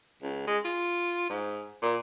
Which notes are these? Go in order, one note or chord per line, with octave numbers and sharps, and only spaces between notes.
C#2
G#3
F4
G#2
A#2